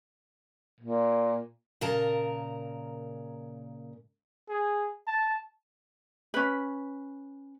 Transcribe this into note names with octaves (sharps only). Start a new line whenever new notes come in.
A#2
A#2 C#3 A#4 A5 A#5
G#4
A5
C#4 B4